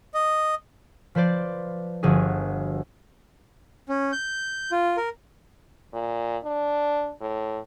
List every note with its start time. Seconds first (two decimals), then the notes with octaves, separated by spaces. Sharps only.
0.14 D#5
1.15 F3 B4 C5 D5
2.03 G1 F3 F#4 G#4
3.88 C#4
4.12 G6
4.72 F4
4.97 A#4
5.93 A#2
6.44 D4
7.21 A2